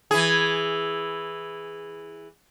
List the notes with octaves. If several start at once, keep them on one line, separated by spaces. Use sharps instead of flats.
E3 G#4